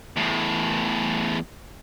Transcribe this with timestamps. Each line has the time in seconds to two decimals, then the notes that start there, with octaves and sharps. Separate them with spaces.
0.17 E2 A2